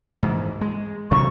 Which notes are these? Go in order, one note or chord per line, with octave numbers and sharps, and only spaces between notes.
G#2 E3
G#3
C3 E3 F#3 C#6